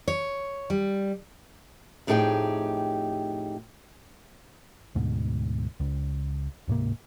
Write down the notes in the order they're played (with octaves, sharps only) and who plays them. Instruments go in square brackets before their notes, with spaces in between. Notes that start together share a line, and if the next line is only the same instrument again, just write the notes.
[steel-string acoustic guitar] C#5
G3
F2 A2 D#4 G4 G#4 G5
[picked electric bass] D2 G#2 B2
C#2
D1 G#2 C3 A#3